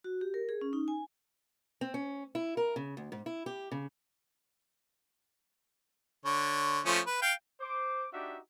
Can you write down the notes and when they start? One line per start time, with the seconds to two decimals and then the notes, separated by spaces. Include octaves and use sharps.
0.04 F#4
0.21 G4
0.34 A#4
0.49 G#4
0.61 C#4
0.73 D#4
0.88 G#5
1.81 C4
1.94 C#4
2.35 E4
2.57 A#4
2.76 C#3
2.97 D2
3.12 G#2
3.26 E4
3.46 G4
3.72 C#3
6.26 D3 C#5
6.86 F3 A3 C#4
7.07 B4
7.22 F5 G5
7.60 C5 D6
8.12 D4 D#4 F#4 G4 E5